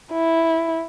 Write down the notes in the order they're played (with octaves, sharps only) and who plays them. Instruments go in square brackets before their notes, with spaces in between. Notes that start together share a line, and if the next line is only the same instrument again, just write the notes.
[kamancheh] E4